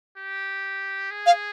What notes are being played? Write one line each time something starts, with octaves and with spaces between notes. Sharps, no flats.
G4
G#4
F5